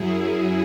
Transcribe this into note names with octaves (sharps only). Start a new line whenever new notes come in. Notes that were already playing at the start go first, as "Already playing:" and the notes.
Already playing: F#2 F#3 E4 G#4